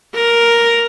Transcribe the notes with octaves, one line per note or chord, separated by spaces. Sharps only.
A#4